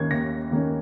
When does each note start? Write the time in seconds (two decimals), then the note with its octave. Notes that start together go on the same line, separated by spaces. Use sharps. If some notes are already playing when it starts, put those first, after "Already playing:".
Already playing: D#2 D#3 A#3 C#4 G#6
0.11 D#2 A#6
0.51 D#3 A#3 C#4